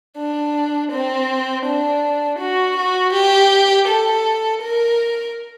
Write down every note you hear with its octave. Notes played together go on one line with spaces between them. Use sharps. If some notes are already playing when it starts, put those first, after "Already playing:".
D4
C4
D4
F#4
F#4
G4
A4
A#4